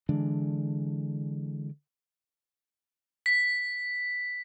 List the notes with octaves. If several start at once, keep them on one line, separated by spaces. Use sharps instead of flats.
D3 E3 G#3 D4
B6